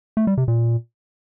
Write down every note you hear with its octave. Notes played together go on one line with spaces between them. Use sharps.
A3
G3
C3
A#2